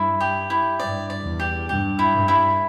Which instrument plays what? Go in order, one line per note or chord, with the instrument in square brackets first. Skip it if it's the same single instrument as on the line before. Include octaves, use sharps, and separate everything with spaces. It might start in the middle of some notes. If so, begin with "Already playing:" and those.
Already playing: [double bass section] G2 [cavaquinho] E4
[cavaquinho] G4
E4
[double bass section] G2 [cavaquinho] D5
[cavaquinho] D5
[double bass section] E2
[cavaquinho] G4
[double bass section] G2 [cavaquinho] G4
[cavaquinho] E4
[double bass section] G2
[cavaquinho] E4